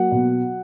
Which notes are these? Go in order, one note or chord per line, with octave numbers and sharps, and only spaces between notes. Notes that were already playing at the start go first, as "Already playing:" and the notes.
Already playing: F#3 A#3 F#5
B2